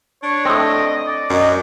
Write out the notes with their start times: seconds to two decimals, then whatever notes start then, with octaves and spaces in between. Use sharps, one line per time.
0.23 D4 C#5
0.45 A2 C4 D#5
1.06 D5
1.30 F#2 D#5